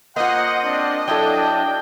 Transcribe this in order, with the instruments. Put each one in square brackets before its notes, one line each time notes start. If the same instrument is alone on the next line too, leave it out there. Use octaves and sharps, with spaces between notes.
[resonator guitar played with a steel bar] A#3 F4 [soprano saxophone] C5 [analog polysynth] D#5 [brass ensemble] F#5
[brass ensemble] C4 D4
[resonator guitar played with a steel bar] F#3 E4 A4 [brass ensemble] D4 [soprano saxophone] G5